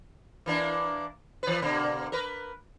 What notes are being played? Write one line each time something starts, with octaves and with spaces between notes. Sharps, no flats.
E3 A#3 D4
E3 B4
B2 D3 A#3
A#4 B4